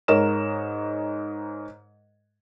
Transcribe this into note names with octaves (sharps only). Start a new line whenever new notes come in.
G#2 A#4 C#5 D#5 E7